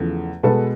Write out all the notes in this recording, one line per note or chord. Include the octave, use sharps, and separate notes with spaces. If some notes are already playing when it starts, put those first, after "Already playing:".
Already playing: E2 C#3 F3 A3
B2 G#3 A4 B4